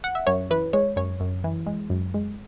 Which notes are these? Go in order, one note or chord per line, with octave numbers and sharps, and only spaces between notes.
F#5
E5
F#2 C#5
E3 B4
G#3 C#5
F#2 C#5
F#2
E3
G#3
F#2
G#3